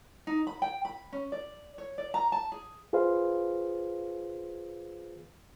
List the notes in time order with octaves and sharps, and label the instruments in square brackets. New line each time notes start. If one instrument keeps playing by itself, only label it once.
[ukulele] D#4
B5
G5
B5
C#4
D5
C#5
D5
A#5
A5
G#4
[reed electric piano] F4 G#4 B4 C5 F5